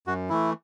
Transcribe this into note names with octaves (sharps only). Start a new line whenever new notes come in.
F#2 F#4
E3 A3 E4